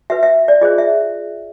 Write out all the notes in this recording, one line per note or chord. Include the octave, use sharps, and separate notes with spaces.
F#4 B4 E5
E5
D5
F4 G#4 C5 D#5
E5